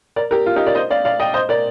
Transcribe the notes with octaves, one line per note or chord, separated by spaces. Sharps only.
A#4 D5
G4 A#4
F4
D#4 G4
A#4 D5
C5 D#5
D5 F5
D5 F5
D#5 G5
C5 D#5
A#4 D5